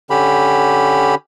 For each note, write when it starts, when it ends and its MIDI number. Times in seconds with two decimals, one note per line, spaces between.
0.10 1.15 50
0.10 1.15 61
0.10 1.15 67
0.10 1.15 83